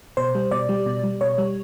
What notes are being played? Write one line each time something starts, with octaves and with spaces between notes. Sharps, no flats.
B2 C5
G3
B2 D5
G3
B2
G3
B2 C#5
G3